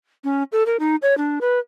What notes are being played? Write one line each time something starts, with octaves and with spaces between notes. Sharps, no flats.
C#4
A4
A#4
D#4
C#5
D4
B4